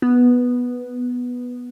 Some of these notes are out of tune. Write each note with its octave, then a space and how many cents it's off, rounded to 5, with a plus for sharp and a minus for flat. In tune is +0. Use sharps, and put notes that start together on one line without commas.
B3 -5